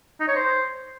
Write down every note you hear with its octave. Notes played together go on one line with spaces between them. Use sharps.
D#4
C#5
C5